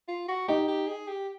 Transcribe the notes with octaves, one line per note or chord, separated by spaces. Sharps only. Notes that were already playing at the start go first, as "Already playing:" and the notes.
F4
F#4
D#4 G4
G4
G#4
G4